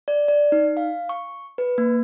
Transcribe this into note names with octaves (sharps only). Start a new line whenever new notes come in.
D5
D5
D#4
F5
C#6
B4
A#3